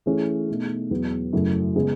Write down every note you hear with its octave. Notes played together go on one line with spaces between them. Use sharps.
E3 A3 C#4 G#4
B2 A3 D#4
E2 B2 F#3 B3
F#2 C#3 F#3 A3 E4
C#3 G#3 B3